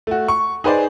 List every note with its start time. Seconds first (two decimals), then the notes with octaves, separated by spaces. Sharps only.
0.07 A3 F#4
0.28 C#6
0.64 D#4 G#4 B4 C5 D5